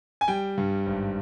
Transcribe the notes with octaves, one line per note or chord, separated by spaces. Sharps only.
G#5
G3 G5
G2
G#1